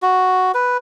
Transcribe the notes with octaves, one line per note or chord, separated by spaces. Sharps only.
F#4
B4